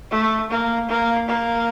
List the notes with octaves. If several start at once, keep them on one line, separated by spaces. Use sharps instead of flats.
A3
A#3
A#3
A#3